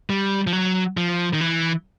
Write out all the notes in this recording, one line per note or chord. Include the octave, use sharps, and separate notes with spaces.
G3
F3
F#3
F3
D#3
E3